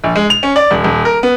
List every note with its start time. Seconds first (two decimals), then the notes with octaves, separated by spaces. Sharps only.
0.04 A#1
0.16 G#3
0.30 F7
0.43 C#4
0.56 D5
0.71 D#1
0.84 D#1
1.05 A#4
1.23 B3